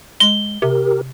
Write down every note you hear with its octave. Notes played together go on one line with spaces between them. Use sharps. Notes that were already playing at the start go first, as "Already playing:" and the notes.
G#3 G7
C3 G4 A#4